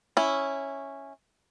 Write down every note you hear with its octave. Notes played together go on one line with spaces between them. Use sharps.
C#4 E4